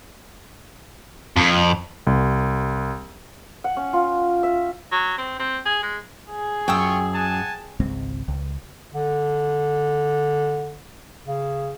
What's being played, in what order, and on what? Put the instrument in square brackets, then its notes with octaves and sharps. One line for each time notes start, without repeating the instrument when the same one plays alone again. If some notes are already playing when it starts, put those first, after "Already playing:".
[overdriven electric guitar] F2
[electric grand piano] C2
[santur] F#5
C#4
F4
E5
[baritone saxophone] F#3
C4
C4
G#4
G#3
[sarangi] G#4
[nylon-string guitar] F#2 [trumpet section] F4 C#6 [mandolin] G5 D#6 E6
[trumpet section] F#5 G#5 A5
[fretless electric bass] G#1 C#2 G#3 C4
C#2
[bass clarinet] D3
C#3